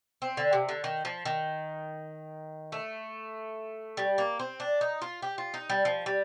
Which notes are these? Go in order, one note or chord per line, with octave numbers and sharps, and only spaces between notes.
C4
D3
C3
D3
D#3
F3
D#3
A3
G3
A#3
C4
D4
D#4
F4
G4
F4
D#4
G3
F3
G3